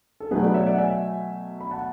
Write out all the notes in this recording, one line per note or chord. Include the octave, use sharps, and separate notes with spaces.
A4
B2 F#3 A3 G#4 B4
B4 D5
C#5 E5
D5 F#5
E5 G#5
B5
F#5 A5